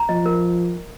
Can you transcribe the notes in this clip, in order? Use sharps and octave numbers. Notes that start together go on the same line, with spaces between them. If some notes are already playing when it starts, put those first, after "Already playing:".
Already playing: A#5
F3 D#5
A#4